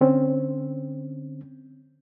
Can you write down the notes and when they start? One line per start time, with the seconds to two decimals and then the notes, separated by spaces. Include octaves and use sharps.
0.01 D3 C4 C#4